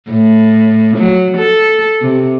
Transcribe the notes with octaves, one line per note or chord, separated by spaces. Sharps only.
A2
F#3
A4
C3